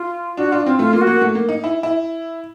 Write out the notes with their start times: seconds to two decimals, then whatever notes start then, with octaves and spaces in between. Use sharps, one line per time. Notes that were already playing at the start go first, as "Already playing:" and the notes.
Already playing: F4
0.37 D4 F#4
0.52 D4 F4
0.66 C4 F4
0.79 A3 F4
0.93 A#3 F4
1.01 F#4
1.07 A#3
1.21 A3
1.35 A#3
1.49 D#4
1.64 E4
1.83 E4